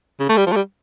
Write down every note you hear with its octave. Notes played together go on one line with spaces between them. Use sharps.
C#3
A3
G3
F3
A3
G3